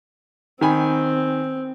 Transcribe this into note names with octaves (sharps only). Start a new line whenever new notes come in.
D#3 C4 G#5 B5